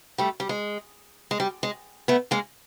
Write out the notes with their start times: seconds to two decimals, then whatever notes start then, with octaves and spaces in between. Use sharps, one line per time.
0.18 G3 A3
0.40 G3
0.49 G#3
1.31 G#3
1.40 G3
1.63 G#3
2.08 A3 B3
2.31 G#3 A#3